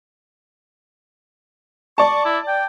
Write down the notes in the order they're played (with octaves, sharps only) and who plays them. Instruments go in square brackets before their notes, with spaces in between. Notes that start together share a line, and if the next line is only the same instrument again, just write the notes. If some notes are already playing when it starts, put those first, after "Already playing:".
[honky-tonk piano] D5 A5 [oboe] C#6
[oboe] E4
G5